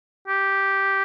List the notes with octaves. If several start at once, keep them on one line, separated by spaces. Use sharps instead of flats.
G4